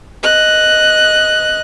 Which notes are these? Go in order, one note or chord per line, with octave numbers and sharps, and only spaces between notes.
D#5 F#6